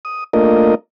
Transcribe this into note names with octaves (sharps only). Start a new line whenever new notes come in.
D#6
A3 A#3 D4 F4 A#4 D#5